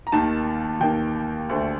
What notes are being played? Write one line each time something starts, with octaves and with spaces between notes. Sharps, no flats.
A#5
D#2 D#3 A#3 A5
D#2 D#3 A#3 G5
D2 D3 A3